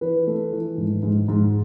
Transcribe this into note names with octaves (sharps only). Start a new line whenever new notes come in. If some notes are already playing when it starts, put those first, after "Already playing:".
E3 B4
A3
E3
G#2
G#2
G#2